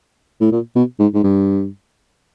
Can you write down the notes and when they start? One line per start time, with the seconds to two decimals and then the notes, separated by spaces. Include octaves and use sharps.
0.41 A2
0.52 A#2
0.76 B2
0.99 G#2
1.14 G#2
1.24 G2